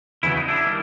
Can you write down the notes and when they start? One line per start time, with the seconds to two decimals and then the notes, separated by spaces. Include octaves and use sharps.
0.23 E2 C#3 F#3 B3 E4
0.36 D#4
0.48 D4 E4
0.65 D#3 G3 A#3